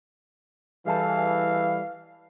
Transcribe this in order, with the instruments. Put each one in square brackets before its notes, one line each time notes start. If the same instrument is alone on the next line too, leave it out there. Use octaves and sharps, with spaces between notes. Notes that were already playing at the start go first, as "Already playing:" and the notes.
[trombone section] E3 [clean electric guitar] G3 G#4 A4 [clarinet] F5